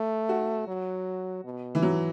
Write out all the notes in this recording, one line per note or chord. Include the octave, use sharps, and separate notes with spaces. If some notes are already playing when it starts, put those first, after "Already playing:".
Already playing: A3
F#4
F#3
B2
E3
F#3